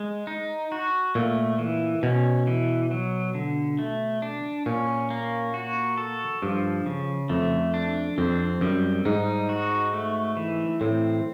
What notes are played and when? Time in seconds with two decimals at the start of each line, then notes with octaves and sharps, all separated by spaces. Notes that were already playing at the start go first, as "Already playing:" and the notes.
Already playing: G#3
0.27 D#4
0.72 F#4
1.15 A#2 A3
1.59 E3
2.03 B2 C#4
2.47 E3
2.91 F#3
3.35 D3
3.79 A3
4.22 D4
4.66 A#2 C#4
5.10 A#3
5.54 F#4
5.97 A4
6.42 G2 F3
6.86 C#3
7.29 F2 A3
7.74 D4
8.18 F2 C4
8.61 F#2 G3
9.05 G#2 D#4
9.49 F#4
9.93 A3
10.37 E3
10.81 A2 C4